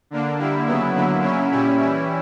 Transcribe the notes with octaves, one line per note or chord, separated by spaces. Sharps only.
D3 A#3 D4
D3 G3 A#3 E4
C#3 F#3 B3 E4
D3 F#3 A#3 E4
C#3 F#3 C#4 E4
A#2 G3 C#4 E4
E3 G3 C#4 E4